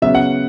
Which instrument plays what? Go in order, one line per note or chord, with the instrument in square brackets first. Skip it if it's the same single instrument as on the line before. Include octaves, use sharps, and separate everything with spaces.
[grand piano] C#3 F#3 B3 E5
F#5